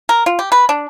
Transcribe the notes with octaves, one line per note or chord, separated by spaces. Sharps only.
A#4
F4
G4
B4
D4